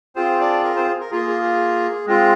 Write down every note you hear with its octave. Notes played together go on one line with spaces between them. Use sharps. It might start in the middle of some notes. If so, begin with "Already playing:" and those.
C4 F4 G#4 C5
D4 D5
A#4
C4 C5
A#4
A#3 F4 G#4
G#4
G#4
G#3 C4 F4 G#4